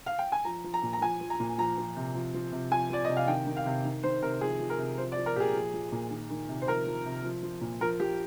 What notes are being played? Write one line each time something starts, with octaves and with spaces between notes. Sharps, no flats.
F5
G5
G#5
F3 A#5
F3
A#5
A#2
A#5
F3 G#5
F3
A#5
A#2
F3 A#5
F3
C3
F3
F3
C3
F3 G#5
F3 D5
C3 D#5
F5
D#3 G5
D#3
F5
C3
D#3
D#3 C5
C3 A#4
F3 G#4
F3
A#4
C3
F3 C5
D5
F3
A#4
A#2 G4 G#4
F3
F3
A#2
D#3
D#3
C3
C5
F3 A#4
F3
C3
F3
F3
A#2
F3 A#4
F3 G4